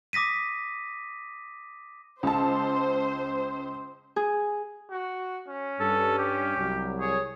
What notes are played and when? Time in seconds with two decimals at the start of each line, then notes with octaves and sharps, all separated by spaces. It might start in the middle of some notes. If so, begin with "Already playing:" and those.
0.13 D6 D#6 A#6 B6 D#7
2.23 C#2 C5 A5
4.16 G#4
4.90 F#4
5.48 C#4
5.80 G2 A4
6.19 G4
6.57 C2 F#3
7.00 G#4 C#5